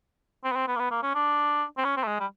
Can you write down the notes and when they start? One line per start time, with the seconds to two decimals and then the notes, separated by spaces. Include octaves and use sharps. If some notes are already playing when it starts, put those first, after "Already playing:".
0.44 C4
0.52 B3
0.56 C4
0.68 B3
0.76 A#3
0.80 B3
0.91 A#3
1.03 C#4
1.15 D4
1.78 C4
1.85 C#4
1.97 C4
2.04 A3
2.08 G#3
2.20 G3